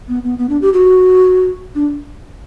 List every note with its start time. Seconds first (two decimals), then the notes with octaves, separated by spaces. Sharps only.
0.08 B3
0.24 B3
0.39 B3
0.49 D4
0.62 G4
0.73 F#4
1.75 D4